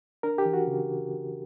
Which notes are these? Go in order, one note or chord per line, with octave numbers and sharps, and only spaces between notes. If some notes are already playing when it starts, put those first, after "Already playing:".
D4 A#4
G4
E3
F#4
C#3